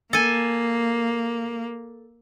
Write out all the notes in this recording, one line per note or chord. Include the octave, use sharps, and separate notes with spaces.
A#3 A4 G#5